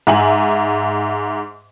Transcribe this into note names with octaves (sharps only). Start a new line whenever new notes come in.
G#2 E5 G#5 F#7